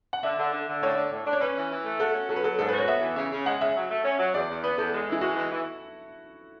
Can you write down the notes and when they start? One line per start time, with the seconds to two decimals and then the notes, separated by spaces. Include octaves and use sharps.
0.13 F#5
0.23 D3 E5
0.39 D3
0.53 D3
0.68 D3
0.82 A2 C#5
0.97 D4
1.12 A2
1.26 D4
1.33 C#5
1.41 C#4 B4
1.55 E3
1.70 E3
1.85 A3
2.00 F#4 A4
2.14 C#4
2.29 F#3 A4
2.36 B4
2.44 F#3 A4
2.59 G#2 A4
2.68 B4
2.73 F#4
2.78 C#5
2.88 B3 E5
3.02 E3
3.16 C#3 E5
3.31 C#3
3.46 G#3 F#5
3.60 C#3 E5
3.76 F#3
3.91 A3
4.04 C#4
4.19 F#3
4.34 E2 D5
4.49 E2
4.63 B3 B4
4.77 E2 A4
4.93 G#3
5.07 E3 E4
5.21 G#3 F#4
5.36 E3
5.51 E3